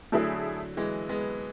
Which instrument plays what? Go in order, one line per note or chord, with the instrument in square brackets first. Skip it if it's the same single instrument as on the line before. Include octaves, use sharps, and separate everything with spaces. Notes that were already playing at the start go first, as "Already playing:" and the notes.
[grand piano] D3 F#3 [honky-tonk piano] A3 E4 G#4
[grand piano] E3 G#3
G#3 B3